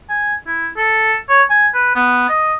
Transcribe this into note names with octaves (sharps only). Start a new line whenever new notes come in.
G#5
E4
A4
C#5
G#5
B4
B3
D#5